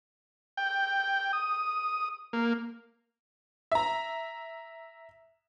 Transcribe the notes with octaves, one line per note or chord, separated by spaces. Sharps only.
G5
D#6
A#3
E5 A#5